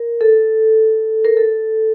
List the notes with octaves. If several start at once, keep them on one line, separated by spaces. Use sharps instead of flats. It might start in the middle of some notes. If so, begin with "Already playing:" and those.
Already playing: A#4
A4
A#4
A4